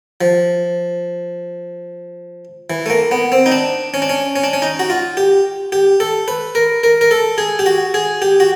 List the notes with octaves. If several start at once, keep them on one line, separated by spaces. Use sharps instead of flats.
F3
E3
A3
A#3
B3
C4
D#4
D4
C#4
D4
C#4
C#4
D4
C#4
D#4
F#4
F4
G4
G4
A4
B4
A#4
A#4
A#4
A4
G#4
G4
F#4
G#4
G4
F#4